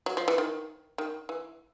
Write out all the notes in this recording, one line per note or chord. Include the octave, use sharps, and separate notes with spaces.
F#3
F3
E3
D#3
D#3
E3